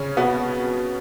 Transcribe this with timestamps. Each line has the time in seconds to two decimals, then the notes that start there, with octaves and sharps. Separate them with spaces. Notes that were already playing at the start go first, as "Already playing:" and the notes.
Already playing: C#3 C#4
0.17 B2 B3